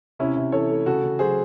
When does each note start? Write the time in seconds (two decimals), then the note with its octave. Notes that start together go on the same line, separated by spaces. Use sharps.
0.19 C3 C#4 E4
0.36 C3
0.52 E3 A4 C#5
0.70 A3
0.86 C#3 F#4 A4
1.03 C#3
1.19 F#3 G#4 C5